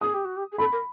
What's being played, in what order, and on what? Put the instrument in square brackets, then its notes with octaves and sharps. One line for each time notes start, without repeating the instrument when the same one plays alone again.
[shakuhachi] G#4 [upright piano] D#6
[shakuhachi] G4
F#4
G4
G#4
[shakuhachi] A4 [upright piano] B5
[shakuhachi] A#4